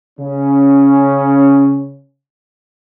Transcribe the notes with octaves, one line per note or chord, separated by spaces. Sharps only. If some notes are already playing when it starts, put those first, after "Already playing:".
C#3 C#4